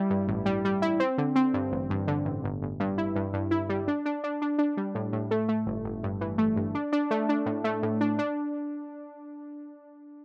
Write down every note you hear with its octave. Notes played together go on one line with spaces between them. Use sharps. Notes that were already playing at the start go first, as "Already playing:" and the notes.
Already playing: G3 E4
G2
A1
G3
G3
E4
C4
D3
C4
G2
A1
G2
D3
A1
G1
G1
G2
E4
G2
G2
E4
G3
D4
D4
D4
D4
D4
G3
A2
A2
A3
A3
G1
G1
G2
E3
A3
G2
D4
D4
A3
D4
A2
A3
A2
D4
D4